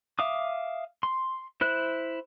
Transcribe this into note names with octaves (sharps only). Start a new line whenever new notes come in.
E5 F5 D6 D#6
C6
E4 C5 F#6